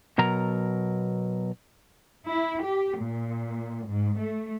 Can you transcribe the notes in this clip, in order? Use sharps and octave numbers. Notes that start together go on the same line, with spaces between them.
B2 F#3 A#4 A#5
E4
G4
A#2
G#2
A3